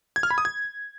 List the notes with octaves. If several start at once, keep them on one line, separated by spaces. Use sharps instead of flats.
G#6
F6
B5
D#6
G#6